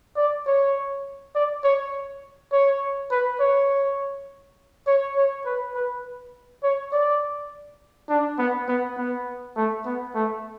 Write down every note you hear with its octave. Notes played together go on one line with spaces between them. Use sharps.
D5
C#5
D5
C#5
C#5
B4
C#5
C#5
C#5
B4
B4
C#5
D5
D4
B3
B3
B3
A3
B3
A3